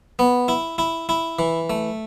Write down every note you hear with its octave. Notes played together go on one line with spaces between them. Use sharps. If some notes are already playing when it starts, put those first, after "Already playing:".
B3
E4
E4
E4
E3
A3